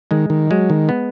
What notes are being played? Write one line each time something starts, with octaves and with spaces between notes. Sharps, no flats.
D#3 G#3
D#3
F#3 G#3
D#3
B3